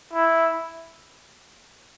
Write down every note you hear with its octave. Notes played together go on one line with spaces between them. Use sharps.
E4